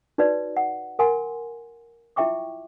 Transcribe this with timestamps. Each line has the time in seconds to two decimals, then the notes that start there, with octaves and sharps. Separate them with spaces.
0.18 D#4 F#4 B4 C#5 D5
0.57 F#5
0.99 A#4 F#5 G#5 C6
2.16 E4 F4 E5 G5 C#6 D6